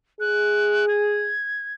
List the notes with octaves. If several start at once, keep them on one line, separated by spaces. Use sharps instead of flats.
G#4 F#6
G#6